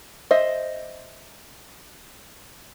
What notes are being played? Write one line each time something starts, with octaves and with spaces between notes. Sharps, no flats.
C5 D#5 E5